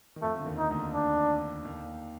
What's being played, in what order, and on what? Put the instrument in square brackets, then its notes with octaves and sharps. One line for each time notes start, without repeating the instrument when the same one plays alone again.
[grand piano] D#3
[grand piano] F2 F3 [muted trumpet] A3
[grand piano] D3
D#2 D#3
[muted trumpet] D#4
[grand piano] D2 D3
[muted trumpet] D4
[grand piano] D#2 D#3